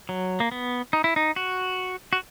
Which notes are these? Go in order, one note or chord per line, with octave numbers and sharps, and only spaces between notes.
F#3
A#3
B3
D#4
E4
D#4
F#4
F#4